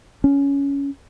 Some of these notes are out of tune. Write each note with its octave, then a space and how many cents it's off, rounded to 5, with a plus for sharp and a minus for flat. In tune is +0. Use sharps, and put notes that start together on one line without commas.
C#4 +15